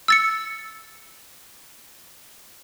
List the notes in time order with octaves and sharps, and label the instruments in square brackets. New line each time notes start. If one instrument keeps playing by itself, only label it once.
[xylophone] E6 A6 C#7